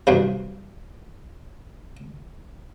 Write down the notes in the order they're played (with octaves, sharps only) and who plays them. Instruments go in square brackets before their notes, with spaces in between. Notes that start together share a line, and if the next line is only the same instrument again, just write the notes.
[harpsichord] B1 G2 C3